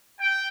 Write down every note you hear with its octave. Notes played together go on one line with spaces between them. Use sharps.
G5